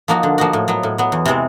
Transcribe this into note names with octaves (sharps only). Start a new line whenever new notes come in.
F3 A#3 D#4 F#4
D3
F3 A#3 D#4 F#4
A2
F#3 B3
A2
F#3 B3
E2
C3 E3 G#3 C4